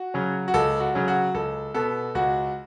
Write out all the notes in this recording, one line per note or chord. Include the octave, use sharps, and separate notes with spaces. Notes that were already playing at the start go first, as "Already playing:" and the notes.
Already playing: F#4
C#3 F#3 C#4
F#4
C#2 A4
F#4
C#3 F#3 C#4
F#4
C#2 A4
B2 B3 A4
C#2 F#4